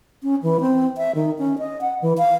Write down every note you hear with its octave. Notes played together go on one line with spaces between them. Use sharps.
C#4
E3
C4
E5
D#3
C#4
D#5
F#5
E3
F5